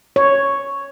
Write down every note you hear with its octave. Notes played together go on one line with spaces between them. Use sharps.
C#5